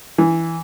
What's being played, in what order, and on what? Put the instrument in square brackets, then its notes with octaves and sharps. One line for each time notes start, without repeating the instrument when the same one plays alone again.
[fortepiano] E3